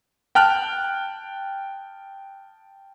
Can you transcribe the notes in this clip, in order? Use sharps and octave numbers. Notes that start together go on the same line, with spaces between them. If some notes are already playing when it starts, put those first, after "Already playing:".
G5 A5 F6 F#6